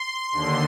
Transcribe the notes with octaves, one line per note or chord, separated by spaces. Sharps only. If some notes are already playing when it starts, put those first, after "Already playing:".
Already playing: C6
D#2 D3 C6